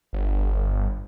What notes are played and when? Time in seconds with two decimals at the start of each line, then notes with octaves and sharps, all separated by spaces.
0.13 G1